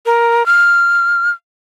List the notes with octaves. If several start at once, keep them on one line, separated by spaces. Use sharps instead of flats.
A#4
F6